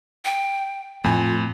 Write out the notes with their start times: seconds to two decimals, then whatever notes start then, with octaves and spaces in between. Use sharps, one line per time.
0.25 G5
1.04 F2 A2 A3 F4 G#5